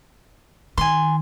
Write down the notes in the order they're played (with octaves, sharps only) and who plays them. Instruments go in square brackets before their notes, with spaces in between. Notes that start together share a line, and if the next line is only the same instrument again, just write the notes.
[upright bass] D#3 [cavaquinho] G#5 C6